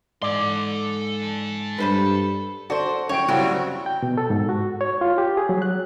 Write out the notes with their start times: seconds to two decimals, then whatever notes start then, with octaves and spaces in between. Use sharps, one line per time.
0.22 G#2 A4 D5 C6
1.78 G2 B4 C5 B5
2.70 F#4 A4 C5 D5
3.09 F#2 C#5 G5 D7
3.29 A2 C#3 F#3 G3 C4 F#4
3.86 G5
4.03 B2
4.18 A4
4.30 G#2
4.49 F#4
4.81 C#5
5.01 F4
5.18 G4
5.37 G#4
5.49 F#3
5.62 F#6